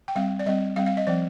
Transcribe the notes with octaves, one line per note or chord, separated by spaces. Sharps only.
G5
G3 C4 F5
D5
G3 C4 D#5
G3 C4 F5
F5
D#5
F3 C4 D5